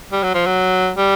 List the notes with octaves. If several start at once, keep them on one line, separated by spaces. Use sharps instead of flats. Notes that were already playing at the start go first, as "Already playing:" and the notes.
G3
F#3
F3
F#3
G3